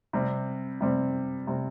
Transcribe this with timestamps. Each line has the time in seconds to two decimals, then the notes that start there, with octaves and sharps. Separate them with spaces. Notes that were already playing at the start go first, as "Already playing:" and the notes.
0.13 C3 G3 C4
0.81 C3 G3 C4
1.47 C3 G3 C4